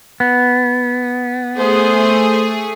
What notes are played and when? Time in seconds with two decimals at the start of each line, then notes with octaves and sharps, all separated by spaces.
0.20 B3
1.58 A3 G#4 C5